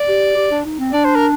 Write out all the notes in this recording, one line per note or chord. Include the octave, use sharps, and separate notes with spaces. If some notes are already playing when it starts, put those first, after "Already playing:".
Already playing: D5
G4
G4
D4
D#4
C4
D4 D5
C5
A#4